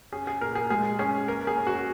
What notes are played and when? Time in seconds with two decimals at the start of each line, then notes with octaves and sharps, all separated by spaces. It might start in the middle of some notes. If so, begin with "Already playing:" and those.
0.12 C#4 G#4
0.27 G#4
0.41 A#2 A#4
0.55 G#4
0.70 G#3 G#4
0.99 C#4 G#4
1.28 A#3 A#4
1.47 G#4
1.57 C#4
1.67 F#4